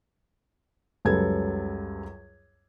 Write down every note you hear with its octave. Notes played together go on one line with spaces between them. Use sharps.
C#2 F#2 G3 A4 B4 G#6